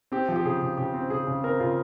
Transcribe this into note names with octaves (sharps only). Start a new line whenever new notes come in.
C4 G4
F3
G4
C#3 G#4
C#3
C#3 G4
C4
C#3 G#4
C#3
C4 A#4
C#3 F4